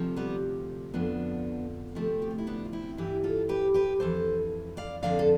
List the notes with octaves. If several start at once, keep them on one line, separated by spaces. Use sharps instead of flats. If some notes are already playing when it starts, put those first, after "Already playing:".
Already playing: D2 C3 F3
G3 B3
F2 D3 F3 B3 D4
D2 C3 F3 A3 C4
G4
F4
E4
B3 D4
F4
C4 E4
G2 E3 E4 G4
F4 A4
G4 B4
G4 B4
F2 E3 A4 C5
D5 F5
F2 D3 F3 D5 F5
A4